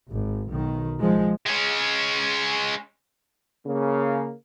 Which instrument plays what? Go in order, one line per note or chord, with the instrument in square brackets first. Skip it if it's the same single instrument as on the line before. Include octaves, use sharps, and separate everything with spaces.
[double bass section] G#1
B1 D#3
F3 G#3
[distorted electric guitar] G#3 C#4
[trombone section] C#3 A#3